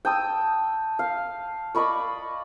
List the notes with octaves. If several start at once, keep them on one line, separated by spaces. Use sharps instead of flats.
G5 A5 D#6 E6
F5
D5 D#5 B5 C#6